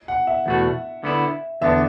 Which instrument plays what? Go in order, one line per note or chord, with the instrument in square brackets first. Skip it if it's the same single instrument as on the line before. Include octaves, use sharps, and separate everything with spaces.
[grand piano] F#5
E5
[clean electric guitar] E2 B2 A3 F#4
D3 B3 E4
[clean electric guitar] E2 D3 B3 D4 [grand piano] E5